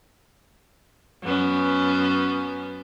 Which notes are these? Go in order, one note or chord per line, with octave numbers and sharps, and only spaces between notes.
F#2 B3 C#4